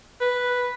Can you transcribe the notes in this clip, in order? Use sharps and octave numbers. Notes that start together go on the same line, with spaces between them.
B4